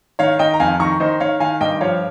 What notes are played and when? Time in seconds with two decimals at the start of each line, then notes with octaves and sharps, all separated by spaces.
0.19 D#3 C#5 F5
0.39 D#3 D#5 G5
0.54 A#5
0.60 F2 F5 G#5
0.80 D#3 A#5 C#6
1.00 D#3 C5 D#5
1.20 D#3 C#5 F5
1.40 D#3 F5 G#5
1.61 G2 D#5 G5
1.81 F3 C#5 F5